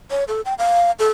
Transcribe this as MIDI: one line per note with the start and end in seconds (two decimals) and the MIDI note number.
0.11 0.24 73
0.28 0.41 69
0.45 0.54 79
0.59 0.91 77
0.99 1.10 69